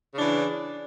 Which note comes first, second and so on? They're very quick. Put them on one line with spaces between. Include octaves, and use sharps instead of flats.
C#3 D4 E3